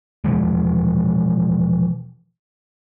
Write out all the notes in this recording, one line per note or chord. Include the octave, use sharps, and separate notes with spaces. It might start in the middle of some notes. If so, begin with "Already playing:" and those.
B2 E3 F3 G#3